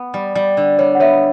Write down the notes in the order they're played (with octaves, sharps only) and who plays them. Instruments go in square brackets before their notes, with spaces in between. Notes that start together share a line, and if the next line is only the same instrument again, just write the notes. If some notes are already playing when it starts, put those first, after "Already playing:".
Already playing: [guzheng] B3
G3
G3
D3
[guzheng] G3 [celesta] C#5
[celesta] F#5
[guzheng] B3 [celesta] C#5 E5